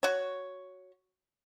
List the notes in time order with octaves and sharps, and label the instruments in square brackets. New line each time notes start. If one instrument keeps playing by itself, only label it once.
[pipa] F#4 C#5